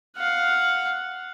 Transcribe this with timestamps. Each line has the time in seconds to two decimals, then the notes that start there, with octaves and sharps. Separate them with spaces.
0.17 F5 F#5